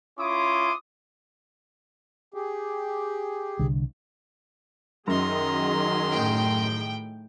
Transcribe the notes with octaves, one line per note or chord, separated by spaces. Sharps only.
C#4 E4 F4 C6 D6 D#6
G4 G#4
C2 D3
F#2 D#3 F#3 G#4 A#5 C6
A2 G5